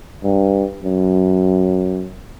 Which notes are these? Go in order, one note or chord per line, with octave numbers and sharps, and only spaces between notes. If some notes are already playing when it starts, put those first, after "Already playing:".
G2
F#2